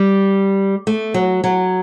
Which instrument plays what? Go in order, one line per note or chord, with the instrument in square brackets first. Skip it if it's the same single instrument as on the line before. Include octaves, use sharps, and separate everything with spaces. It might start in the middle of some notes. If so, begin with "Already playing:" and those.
Already playing: [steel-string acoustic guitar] G3
A3
F#3
F#3